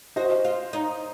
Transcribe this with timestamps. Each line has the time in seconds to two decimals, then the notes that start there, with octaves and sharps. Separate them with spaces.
0.16 F#4 C5 D#5
0.45 F4
0.73 D#4